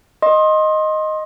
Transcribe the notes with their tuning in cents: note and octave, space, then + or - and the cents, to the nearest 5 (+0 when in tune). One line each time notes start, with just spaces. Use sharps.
D#5 +0 C6 +30